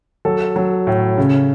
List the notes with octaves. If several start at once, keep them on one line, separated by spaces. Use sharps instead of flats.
F#3 A4
F#3
A2
C#3